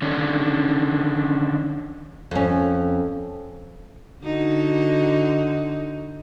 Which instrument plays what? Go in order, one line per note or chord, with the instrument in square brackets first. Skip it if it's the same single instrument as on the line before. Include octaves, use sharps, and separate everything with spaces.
[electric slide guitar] D3 D#3 C#4 D4
[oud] F2 C#4
[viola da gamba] D3 D#4 F#4